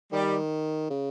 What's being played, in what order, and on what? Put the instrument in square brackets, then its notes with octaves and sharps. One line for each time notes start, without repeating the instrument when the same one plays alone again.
[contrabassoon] D#3 [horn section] G3
[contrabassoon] C#3